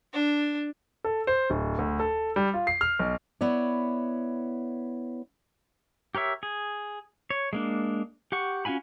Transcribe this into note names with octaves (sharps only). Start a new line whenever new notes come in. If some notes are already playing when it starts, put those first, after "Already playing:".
D4
A4
C5
D1
D2
A4
G3
F4
C7
F6
B1
B3 E4 C#5 D5
G4 A#4 C#5 E5
G#4
C#5
G#3 A#3 D4
G4 F#5 C#6
C#4 F4 F#4 G#5 B5